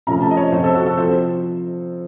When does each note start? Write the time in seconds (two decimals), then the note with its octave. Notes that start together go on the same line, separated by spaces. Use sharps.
0.07 C3 F3 A3 C#4 A#5
0.22 A5
0.31 D#5
0.37 C#5
0.52 C3 F3 C4 C5
0.64 A4
0.75 F#4
0.86 A4
0.97 F3 C4 C5